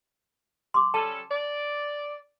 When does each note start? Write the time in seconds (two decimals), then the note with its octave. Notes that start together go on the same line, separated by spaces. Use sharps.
0.74 C6 D6
0.94 G3 C#4 A4 A5
1.31 D5